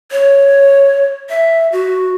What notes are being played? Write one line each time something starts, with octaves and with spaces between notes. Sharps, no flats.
C#5
E5
F#4